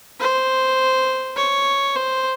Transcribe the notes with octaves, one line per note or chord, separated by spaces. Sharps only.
C5
C#5
C5